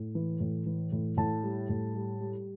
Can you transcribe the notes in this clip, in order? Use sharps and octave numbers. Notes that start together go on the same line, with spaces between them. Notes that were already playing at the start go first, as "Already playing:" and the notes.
Already playing: A2
E3
A2
E3
A2
A2 A5
G3
A2
G3
G3